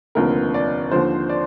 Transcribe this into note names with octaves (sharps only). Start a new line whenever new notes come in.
F1 D#2 D3 F3 A#4
D5
D#2 D3 F3 C5
D5